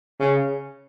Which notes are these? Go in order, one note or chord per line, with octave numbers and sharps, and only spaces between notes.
C#3